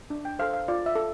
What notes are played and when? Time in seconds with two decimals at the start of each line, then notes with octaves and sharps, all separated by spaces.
0.10 D4
0.25 G5
0.39 A4 C5 F5
0.53 F5
0.68 F4 D5
0.86 E5
0.96 A4